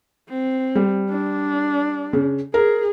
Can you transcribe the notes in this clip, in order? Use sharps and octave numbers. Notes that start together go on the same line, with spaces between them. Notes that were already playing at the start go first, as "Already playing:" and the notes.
C4
G3
D4
C#3
G#4 A#4